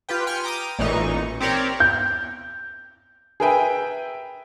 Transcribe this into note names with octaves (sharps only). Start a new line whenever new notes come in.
F4 G4 B4 G5
G5 G#5 F6 G6 C#7 D7
G5 A#5 D6 D#6 D#7
A1 A#2 E3 D#4 C#6
C4 G4 A#4 C#5 D5
G6
G#4 A#4 B4 E5 G5 G#5